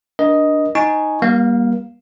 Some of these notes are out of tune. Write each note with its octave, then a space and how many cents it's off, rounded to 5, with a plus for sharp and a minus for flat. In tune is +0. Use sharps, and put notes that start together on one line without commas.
D4 +0 A#4 +30 D#5 +5
D#4 +0 G#5 +10 C#6 +0
G3 +0 A#3 +35 F5 +0